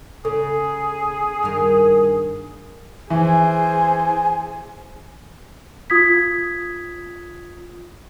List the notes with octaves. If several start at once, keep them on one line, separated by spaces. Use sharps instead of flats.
C#3 G#4 A4
G2 D#3 A#4
E3 G#4 C5 G#5
F4 D#6 G#6 B6